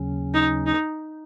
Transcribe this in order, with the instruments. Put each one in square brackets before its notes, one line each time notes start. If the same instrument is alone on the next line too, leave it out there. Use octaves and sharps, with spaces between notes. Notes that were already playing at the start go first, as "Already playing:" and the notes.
Already playing: [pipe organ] D#2 C#3 F#3 C#4
[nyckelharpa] D#4
D#4